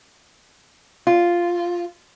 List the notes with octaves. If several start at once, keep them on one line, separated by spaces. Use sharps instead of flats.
F4